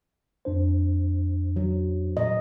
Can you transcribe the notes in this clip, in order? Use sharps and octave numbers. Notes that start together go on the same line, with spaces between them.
F2 D4 C5
F#3
A#2 F#3 D#5